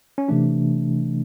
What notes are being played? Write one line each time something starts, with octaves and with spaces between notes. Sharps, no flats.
C#4
C3 E3 A3 D4